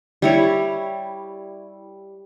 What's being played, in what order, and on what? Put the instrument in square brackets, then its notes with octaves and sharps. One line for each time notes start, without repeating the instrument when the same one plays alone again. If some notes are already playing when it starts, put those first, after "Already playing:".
[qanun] G3 E4 C#5